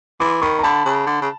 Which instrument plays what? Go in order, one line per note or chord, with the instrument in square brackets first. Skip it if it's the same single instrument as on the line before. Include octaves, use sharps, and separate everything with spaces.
[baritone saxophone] E3 [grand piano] C6 D6
[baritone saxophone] D#3 [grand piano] B5 C#6
[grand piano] A#5
[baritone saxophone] D3 [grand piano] A5 B5
[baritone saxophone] C#3
D3
C#3